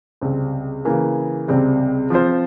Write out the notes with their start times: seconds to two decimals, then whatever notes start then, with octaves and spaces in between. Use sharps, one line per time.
0.21 C#2 C3 G3 C4
0.85 C#3 E3 A#3
1.48 C#2 C3 G3 C4
2.10 F3 C4 F4 C5